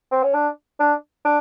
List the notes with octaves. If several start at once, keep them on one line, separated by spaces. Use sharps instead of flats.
C4
C#4
D4
D4
D4